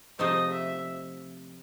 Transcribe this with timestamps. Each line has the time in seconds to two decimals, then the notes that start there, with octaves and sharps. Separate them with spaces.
0.19 C3 F3 A3 C4 D#4 D#5
0.52 E5